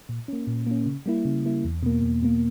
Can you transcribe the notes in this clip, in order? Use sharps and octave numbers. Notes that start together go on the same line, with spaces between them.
A#2
A#3 C#4
A#2
A#3 C#4
C#3
G3 A#3 E4
C#3
G3 A#3 E4
E2
B2 A#3
E2
B2 A#3